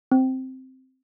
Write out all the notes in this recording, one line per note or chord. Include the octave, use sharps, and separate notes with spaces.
C4